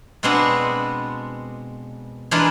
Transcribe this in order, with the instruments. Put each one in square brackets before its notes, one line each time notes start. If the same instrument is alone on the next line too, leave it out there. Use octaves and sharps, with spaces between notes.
[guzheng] B2 G#3 B3 C4 D4 F#4
E3 G#3 D4 F4 A#4 B4